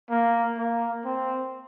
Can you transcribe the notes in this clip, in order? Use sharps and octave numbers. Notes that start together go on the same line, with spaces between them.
A#3
A#3
C4